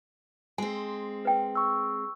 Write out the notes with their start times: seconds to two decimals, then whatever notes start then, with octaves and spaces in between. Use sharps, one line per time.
0.58 G#3 C4 G#5
1.25 B4 G5
1.55 C#6 E6